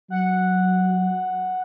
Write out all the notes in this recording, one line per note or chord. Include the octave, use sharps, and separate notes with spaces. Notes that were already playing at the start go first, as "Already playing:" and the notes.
F#3 F#5